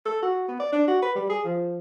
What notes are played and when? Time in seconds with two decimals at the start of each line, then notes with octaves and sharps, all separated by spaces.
0.06 A4
0.22 F#4
0.48 B3
0.60 D5
0.72 D4
0.88 F#4
1.02 B4
1.15 G3
1.30 G#4
1.44 F3